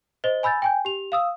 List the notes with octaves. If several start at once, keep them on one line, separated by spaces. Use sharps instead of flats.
C5 D#5 G7
G#5 B5 E6 G6 A6
G5 G#5 G6
G4 F7
F5 D#6 E6